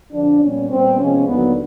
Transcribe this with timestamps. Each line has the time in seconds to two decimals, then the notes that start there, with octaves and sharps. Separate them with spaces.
0.12 F2 D3 F3 D4
0.41 A#2 G3 B3 C#4
0.70 A#2 G3 B3 C4
0.99 C3 F3 G#3 B3 C#4
1.28 D#2 D3 F#3 B3